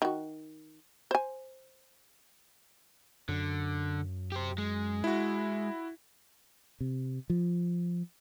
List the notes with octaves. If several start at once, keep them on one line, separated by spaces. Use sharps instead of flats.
D#3 F#4
C5 G#5
F#2 D3
G4 C5
G#3
E4 F#4
C3
F3